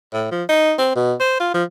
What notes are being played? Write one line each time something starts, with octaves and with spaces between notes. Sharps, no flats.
A2
F3
D#4
C4
B2
C5
F4
F3